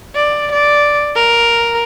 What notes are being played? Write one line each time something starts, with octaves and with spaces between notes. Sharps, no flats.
D5
D5
A#4